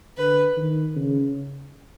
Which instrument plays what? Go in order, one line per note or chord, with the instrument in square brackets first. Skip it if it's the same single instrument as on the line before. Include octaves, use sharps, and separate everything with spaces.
[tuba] D3 [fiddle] B4
[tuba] D#3
C#3